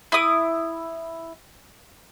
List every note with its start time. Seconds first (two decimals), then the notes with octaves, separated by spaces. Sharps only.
0.12 E4 D#6